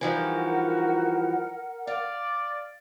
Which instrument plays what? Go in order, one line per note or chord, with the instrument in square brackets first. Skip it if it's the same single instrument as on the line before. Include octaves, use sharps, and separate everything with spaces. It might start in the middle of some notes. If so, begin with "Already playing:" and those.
[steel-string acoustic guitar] E3 F3 G3 [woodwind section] D#4 F#4 [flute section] A#4 F#5
[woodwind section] D5 [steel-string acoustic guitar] F5